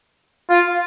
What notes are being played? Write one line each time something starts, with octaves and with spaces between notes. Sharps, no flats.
F4